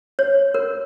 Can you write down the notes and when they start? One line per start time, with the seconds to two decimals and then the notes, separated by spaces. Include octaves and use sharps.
0.19 C#5
0.54 A#4